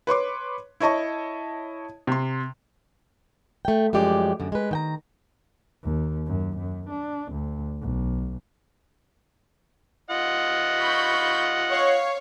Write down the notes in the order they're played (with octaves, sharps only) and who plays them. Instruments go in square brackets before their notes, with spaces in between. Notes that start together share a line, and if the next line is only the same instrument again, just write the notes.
[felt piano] B4 C#5 C6 D6
E4 C#5 D#5 A5 C#6
C3 C6
[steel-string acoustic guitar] A3 G5
F#2 F3 G#3 G4 D5
F#2 D3
G#3 B4
D#3 G5 A#5
[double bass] D#2
F#2
F#2
D4
D2
B1
[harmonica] F4 D#5 F#5
[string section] B5 C#6 G6
C#5 F5